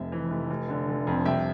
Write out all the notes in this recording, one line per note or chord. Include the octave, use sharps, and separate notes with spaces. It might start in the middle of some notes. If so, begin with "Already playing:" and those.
Already playing: F1 F2 E5
E3
F1
F1
D3
F1
F2
C2 E5 G5